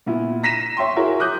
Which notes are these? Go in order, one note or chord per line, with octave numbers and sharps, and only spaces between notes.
A#2 B3 E4
A#5 A#6 B6 D#7 E7
C#5 E5 G5 C6
E4 F#4 G#4 A#4 C#5
D6 D#6 F#6 G6